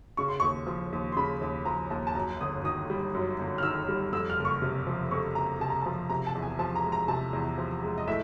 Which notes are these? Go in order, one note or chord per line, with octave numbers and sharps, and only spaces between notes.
C#3 C#6
C6
D#2 C#6
F3
D#2
C6
C#3 B5
D#2
F3 A#5
D#2 A5
A5
F#2 A#5
G1 D#6
D#3 D#6
G3
F#2
G1
F6
D#3 E6
G3
F2 E6
F6
F#1
C#6
C3
F3
F2 C#6
F#1 A#5
C3 A5
A#5
A5
F3
C3 A#5
A5
E2
G#5
F3 A5
A#5
G#3
A#5
C3 A5
E2
F3
G#3
D#5
A2 E5